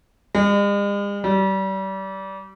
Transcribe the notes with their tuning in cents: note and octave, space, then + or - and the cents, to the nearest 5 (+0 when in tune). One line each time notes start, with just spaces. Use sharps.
G#3 -45
G3 -30